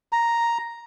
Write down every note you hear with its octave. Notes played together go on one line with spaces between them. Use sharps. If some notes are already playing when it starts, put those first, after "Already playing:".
A#5